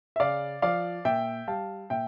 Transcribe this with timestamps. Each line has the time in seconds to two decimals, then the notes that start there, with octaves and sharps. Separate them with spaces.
0.16 E5
0.20 C#3 D5 F5
0.62 F3 D5 F5
1.05 A#2 E5 G5
1.47 G3 F5 A5
1.90 A#2 E5 G5